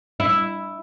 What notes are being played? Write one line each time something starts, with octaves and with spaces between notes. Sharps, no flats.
E4